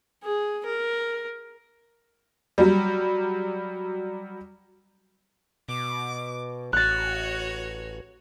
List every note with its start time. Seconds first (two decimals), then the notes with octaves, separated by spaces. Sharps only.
0.23 G#4
0.65 A#4
2.58 F#3 G3
5.69 B2 D6
6.73 A1 F#4 C#5 F#6 A6